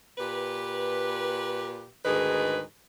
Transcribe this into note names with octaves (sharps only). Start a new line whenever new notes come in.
A#2 G4 B4
D2 G#2 D#3 G#4 B4